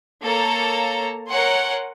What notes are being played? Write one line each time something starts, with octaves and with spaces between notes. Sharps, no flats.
A#3 A4 C#5 A#5
A#4 C#5 F#5 G#5 C6